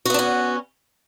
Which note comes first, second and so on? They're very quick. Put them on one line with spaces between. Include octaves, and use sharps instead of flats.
F#4 B3 D4 C#4